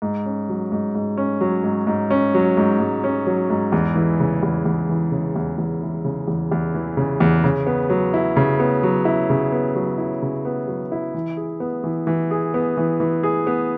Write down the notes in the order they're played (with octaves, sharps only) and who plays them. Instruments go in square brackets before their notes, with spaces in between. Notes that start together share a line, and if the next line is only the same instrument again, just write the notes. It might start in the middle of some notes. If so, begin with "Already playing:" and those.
[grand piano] G#2
C#4
F#3
G#2
G#2
C#4
F#3
G#2
G#2
C#4
F#3
G#2
G#2
C#4
F#3
G#2
E2
E3
C#3
E2
E2
E3
C#3
E2
E2
E3
C#3
E2
E2
E3
C#3
E2
C#3
B3
F#3
E4
C#3
B3
F#3
E4
C#3
B3
F#3
E4
C#3
B3
F#3
E4
E3
G#4
B3
E3
E3
G#4
B3
E3
E3
G#4
B3